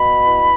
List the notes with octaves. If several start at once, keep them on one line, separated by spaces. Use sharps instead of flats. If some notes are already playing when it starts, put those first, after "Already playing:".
Already playing: B2 B5
E3